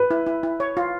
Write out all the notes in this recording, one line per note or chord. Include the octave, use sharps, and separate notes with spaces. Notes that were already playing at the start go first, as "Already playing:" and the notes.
Already playing: B4
E4
E4
E4
C#5
F4